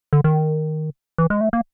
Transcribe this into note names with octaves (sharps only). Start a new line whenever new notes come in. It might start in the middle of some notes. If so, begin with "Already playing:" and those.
D3
D#3
E3
G#3
A3
A#3